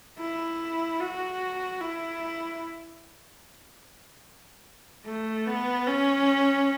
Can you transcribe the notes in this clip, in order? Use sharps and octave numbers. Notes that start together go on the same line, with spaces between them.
E4
F#4
E4
A3
B3
C#4